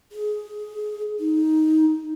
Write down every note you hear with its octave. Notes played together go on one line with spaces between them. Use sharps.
G#4
D#4